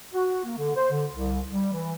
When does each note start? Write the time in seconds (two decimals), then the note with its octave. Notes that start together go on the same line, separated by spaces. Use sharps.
0.13 F#4
0.44 A#3
0.57 D3
0.76 C5
0.91 D3
1.11 C2
1.52 G3
1.73 E3